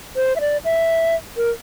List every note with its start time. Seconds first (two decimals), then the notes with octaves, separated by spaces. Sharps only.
0.16 C5
0.36 E5
0.41 D5
0.65 E5
1.37 A#4